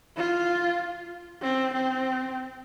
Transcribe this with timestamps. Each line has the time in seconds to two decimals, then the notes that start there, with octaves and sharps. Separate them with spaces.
0.17 F4
1.42 C4
1.73 C4